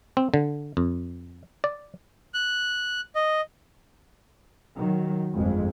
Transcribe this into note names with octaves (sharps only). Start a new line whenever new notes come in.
C4
D3
F2
D5
F#6
D#5
D#3 F#3
G1 F2 G#3